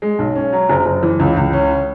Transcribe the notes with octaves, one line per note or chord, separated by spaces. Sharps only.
G#3
B1
C#4
F#3
F#1
F#1
E3
C#2
C#2
C#4